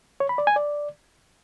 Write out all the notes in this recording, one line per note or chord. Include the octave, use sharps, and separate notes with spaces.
C#5
B5
D5
G#5
D5